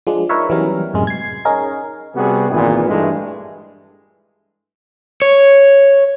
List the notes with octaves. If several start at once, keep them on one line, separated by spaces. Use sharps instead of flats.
F3 G#3 D4
D#4 A#4 B4 C#5 E5
E3 F#3 G3 B3 C#4 A#4
F#2 A2 C3 G#3
G#6 C7
C#4 D#4 G#4 A#4
C3 G3 B3 F#4 G#4
G#1 A#2 E3 G#4 B4
G2 E3 G#3 A3
C#5